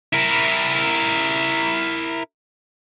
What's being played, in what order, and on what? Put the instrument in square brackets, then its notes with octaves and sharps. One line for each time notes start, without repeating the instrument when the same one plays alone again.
[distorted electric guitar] E4 A#4